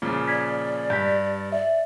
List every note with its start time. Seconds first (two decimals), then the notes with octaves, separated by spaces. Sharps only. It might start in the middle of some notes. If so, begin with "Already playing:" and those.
0.02 A#2 C#3 F3
0.28 D5 G#6 B6
0.90 G2 G6 B6
1.12 G4
1.52 D5 E5